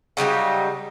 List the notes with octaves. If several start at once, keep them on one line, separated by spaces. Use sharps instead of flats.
C#3 F#3 G3 D#4